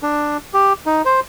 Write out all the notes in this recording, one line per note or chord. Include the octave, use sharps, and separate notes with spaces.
D4
G4
D#4
C5